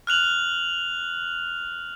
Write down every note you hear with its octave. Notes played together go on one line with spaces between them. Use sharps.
F6 F#6 F7 F#7